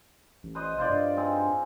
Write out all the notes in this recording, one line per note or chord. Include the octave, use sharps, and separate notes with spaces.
A1
B4 C5 D#5
E1 F4 C5 D5
G2
G#3 C4 D#4